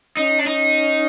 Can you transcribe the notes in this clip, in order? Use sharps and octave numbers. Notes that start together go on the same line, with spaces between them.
C#4 D#4
D4
D#4